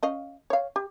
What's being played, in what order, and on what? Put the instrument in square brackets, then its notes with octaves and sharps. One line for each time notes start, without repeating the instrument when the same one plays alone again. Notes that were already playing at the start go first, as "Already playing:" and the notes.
[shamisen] C#4 D#5 F5
C#5 F5
G4